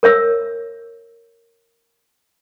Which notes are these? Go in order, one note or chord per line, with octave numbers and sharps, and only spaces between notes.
A#4 C#5 E5 E6